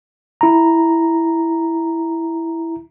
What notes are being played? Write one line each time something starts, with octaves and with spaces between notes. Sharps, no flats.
E4 A#5